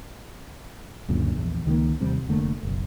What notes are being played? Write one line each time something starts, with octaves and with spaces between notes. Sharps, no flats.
C#2 F#2 A#2 D3
A#1 E2
C#2 D#3 G3 A#3
D#2 C3 G3 C4
F1 D3 A3 A#3
F#1 B1